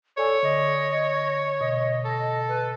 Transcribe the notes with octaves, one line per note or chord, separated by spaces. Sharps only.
A4 C#5 D5 G#5
D3 D#5
B2 D#5
A4
B4